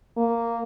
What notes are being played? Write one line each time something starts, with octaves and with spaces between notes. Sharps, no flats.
A#3